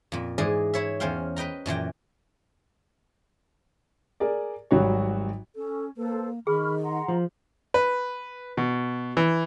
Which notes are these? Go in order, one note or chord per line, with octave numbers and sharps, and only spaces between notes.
F2 A#2
G#2 E3 G#4 D5 D#5
E4 C#5 E5
E2 C#4 C5 F5 G5
B4 D#5 G5 A#5
F#2 A#2 E3 G5
G#4 A#4 D5
G#1 F#3 G3 F#4 C#5
C#4 A4
A#3 A4 B4 C5
D#3 G#4 B5 C#6 F6
F#5 A#5 C6
F3
B4
B2
E3